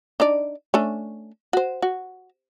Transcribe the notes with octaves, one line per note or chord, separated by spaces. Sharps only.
D4 D#4 D5
A3 C#4 D4
F#4 C5
F#4